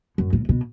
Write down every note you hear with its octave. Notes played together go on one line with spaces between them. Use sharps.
F#2
A2
B2